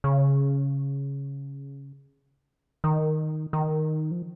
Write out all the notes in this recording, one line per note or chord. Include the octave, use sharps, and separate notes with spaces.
C#3
D#3
D#3
F3